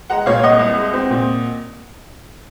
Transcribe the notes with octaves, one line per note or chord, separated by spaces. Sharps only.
G#3 F#5 A#5
A#2 C#5 F5
C2 D#5 F#5
C2
G#3
C4
A#2